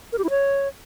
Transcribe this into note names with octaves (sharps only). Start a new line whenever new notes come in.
A#4
G4
E4
C#5